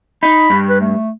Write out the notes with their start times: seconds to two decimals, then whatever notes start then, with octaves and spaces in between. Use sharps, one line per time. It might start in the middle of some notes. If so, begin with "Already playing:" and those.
0.23 D#4 B5
0.50 G2
0.69 B4
0.81 A3